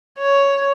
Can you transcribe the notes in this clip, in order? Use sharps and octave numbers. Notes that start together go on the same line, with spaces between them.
C#5